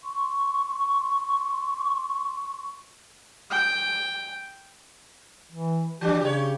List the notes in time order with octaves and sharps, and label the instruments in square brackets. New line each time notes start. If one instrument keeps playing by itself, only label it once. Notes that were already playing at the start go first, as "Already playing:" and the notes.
[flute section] C6 C#6
[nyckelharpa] G5
[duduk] E3
[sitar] E3 G3 D4 [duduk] G4
[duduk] C#3 [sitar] G4 C#5